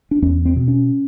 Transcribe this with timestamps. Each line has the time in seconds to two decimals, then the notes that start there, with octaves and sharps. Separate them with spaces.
0.11 D4
0.22 E2 C#4
0.45 C4
0.56 B2
0.68 C#4